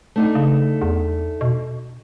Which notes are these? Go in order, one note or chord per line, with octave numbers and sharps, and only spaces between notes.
A3 D4 D#4
C#3
E2
B2